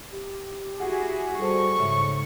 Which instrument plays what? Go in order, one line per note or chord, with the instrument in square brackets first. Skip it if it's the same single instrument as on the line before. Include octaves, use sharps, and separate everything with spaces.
[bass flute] G4
[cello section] E4 F#4 G#4 [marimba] F#5
[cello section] G3 [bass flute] F#4 [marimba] A4 C5 A5 [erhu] C#6
[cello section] G#2 [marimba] C#3 E5 [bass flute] C#5